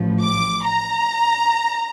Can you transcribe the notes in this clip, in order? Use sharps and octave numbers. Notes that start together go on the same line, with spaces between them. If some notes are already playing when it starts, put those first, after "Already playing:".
Already playing: A1 A2 F3
D6
A#5